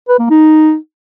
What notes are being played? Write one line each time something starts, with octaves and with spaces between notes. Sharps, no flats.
B4
A#3
D#4